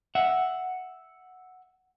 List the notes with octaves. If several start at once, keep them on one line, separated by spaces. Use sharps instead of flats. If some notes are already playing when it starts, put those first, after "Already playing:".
E5 F#5